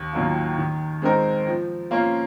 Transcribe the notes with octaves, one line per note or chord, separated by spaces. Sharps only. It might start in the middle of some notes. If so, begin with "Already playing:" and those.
Already playing: D#2
D#3 F#3 A#3 F4
D#3
G#3 C4 D#4 A#4
F3
A#3 C#4 F4